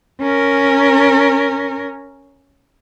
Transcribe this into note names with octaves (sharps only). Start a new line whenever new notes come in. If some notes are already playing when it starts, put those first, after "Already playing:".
C#4 A#4